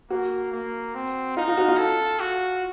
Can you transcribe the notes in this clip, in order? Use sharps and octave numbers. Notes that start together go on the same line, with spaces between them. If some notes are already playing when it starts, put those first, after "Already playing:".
A#3 F#4
A#3
C4
D#4 F4
F4
F#4
F4
A4
F#4